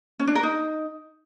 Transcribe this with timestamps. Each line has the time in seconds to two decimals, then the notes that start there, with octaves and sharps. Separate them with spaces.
0.20 C#4
0.27 D4
0.35 A#4
0.43 D#4